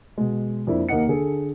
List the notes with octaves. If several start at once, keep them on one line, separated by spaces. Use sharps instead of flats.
B2 G#3
F2 A#3 D4 E4
D#2 A#3 D#5 F#5 C#7
D3 G#4 A4